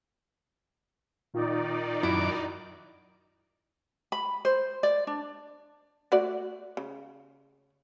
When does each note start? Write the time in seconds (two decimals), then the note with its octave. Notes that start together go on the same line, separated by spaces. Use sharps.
1.34 A#2 D#3 D#4 F4 D5
2.03 F#2 E4 D6
4.12 B5
4.45 C5
4.83 D5
5.07 D4
6.12 A3 F#4 D5
6.77 C#3